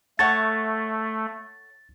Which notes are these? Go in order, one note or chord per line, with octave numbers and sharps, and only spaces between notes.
A3 A4 C#5 F#5 A6